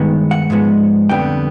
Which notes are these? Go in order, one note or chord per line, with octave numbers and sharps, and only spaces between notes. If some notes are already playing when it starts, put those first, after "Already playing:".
Already playing: G2 D#3 G#3 B3
F#5
G#2 F3 G#3 B3
F2 D3 G3 B3 G5